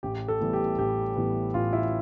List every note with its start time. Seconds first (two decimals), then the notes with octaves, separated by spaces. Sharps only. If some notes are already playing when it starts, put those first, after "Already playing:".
0.03 A1 G4
0.28 A4
0.41 A2 E3 G3 B3
0.53 G4
0.79 A1 G4
1.16 A2 E3 G3 B3
1.54 A1 F4
1.73 E4